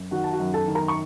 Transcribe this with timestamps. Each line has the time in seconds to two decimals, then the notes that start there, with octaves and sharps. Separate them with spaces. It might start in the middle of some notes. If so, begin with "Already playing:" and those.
Already playing: F#2
0.11 D#3 F#4 F#5
0.24 A5
0.33 F#4 F#5
0.40 F#2
0.54 A4 A5
0.68 D#3
0.75 A#4 A#5
0.88 C#6